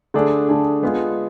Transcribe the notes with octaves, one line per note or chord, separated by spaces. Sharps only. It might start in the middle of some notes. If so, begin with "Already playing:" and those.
D3 A3 D4 G#4
D3 A3 D4 G#4
G#3 B3 F4 G#4